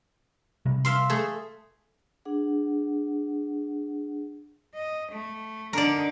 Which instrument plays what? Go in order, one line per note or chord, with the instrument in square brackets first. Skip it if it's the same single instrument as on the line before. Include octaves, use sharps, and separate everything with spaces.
[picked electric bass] C3 G3
[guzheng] E5 F5 C6
A3 G#4
[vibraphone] D4 G#4 F#5
[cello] D#5
A3
[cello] D3 D#4 [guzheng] A#4 D5